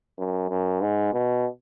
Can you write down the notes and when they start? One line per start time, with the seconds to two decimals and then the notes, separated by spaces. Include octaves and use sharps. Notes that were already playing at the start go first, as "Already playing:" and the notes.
0.18 F#2
0.49 F#2
0.82 G#2
1.13 B2